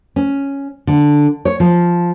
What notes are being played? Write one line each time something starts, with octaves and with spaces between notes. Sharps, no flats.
C#4
D3
C#5
F3